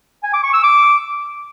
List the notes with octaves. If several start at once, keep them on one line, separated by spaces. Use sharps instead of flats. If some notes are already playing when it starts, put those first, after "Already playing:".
G#5
D6
C#6
E6
D6